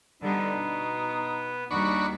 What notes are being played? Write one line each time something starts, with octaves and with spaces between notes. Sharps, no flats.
D3 G3 B3 D#4
B2
D#2 G3 D4 D#4 F#4 B5 C#6